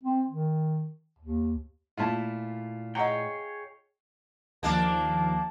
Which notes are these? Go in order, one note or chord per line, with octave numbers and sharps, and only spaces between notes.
C4
D#3
D#2
A#2 A3 E4 F4 A5
G#4 C#5 D#5 F#5 G5 A#5
D#2 F3 A#3 D4 A5